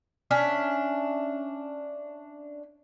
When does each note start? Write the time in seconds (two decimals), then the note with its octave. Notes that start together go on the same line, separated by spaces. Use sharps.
0.31 C#4 D4 E5